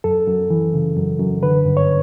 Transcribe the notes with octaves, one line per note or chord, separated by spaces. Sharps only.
F#2 A4
F#2
E3
C#3
F#2
F#2
D3 B4
G2
C#5